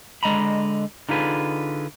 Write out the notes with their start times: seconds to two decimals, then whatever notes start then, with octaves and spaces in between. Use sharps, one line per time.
0.23 D3 G#3 D#5 A#5 B5
1.09 D3 D#4 F4 G#4 B4